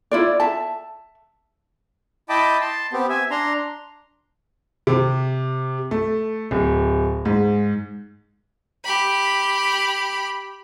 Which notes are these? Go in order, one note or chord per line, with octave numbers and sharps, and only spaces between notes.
E4 F4 D5
E5 A5
E4 D#5 G5 A5 B5 D6
A5 C6
B3 C4 G4
E5 G#5
D4 A#5 C6
C3
A3
D1
G#2
G4 B5